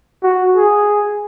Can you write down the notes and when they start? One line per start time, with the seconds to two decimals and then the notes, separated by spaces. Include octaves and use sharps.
0.23 F#4
0.56 G#4